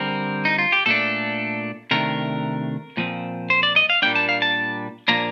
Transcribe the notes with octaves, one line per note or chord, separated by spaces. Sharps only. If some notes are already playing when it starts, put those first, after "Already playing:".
Already playing: D3 G3 C4 A#4
D#4
F4
G4
A#2 A3 D4 A4
C3 D#3 A3 D4 A#4
A#2 F3 C4
C5
D5
D#5
F5
A#2 G3 A#3 D4 G5
A5
F5
A5
A#2 F3 A#3 D4 A#5